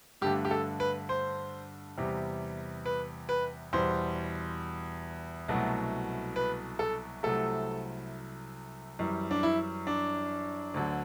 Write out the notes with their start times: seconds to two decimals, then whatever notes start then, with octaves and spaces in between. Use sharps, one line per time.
0.22 G2 D3 A3 G4
0.45 G4
0.51 A4
0.80 B4
1.09 C5
1.98 E2 C3 G3
2.86 B4
3.29 B4
3.73 E2 B2 G3 C5
5.48 C2 B2 F#3 A3
6.36 B4
6.79 A4
7.23 C2 C3 F#3 A3 A4
8.99 F#2 E3 G3
9.31 D4
9.43 E4
9.87 D4
10.74 D2 D3 F#3